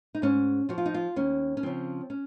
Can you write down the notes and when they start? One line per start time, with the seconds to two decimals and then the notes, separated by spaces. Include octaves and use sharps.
0.15 D#4
0.22 G#2 C#4
0.69 F3 F#4
0.78 F4
0.86 D#4
0.94 F4
1.16 D#2 C#4
1.57 C#4
1.63 C#3 F3 C4
2.10 C#4